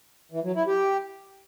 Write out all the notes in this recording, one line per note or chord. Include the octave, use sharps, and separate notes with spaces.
E3
F#3
E4
G4